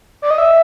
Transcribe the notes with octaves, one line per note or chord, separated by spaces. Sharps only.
D5
D#5
E5